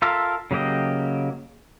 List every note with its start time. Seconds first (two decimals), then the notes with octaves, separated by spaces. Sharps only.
0.02 F4 A4 A#4 E5 F5
0.51 C#3 F#3 A#3 G4 D#5